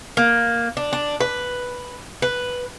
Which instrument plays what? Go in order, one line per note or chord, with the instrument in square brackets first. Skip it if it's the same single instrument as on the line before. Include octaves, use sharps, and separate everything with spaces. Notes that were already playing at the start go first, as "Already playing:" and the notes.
[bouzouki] A#3
D4
D4
B4
B4